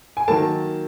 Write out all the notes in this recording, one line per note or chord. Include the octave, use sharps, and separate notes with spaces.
G#5
D#3 F#3 A#3 A5